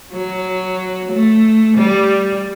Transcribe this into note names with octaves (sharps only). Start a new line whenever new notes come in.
F#3
A3
G3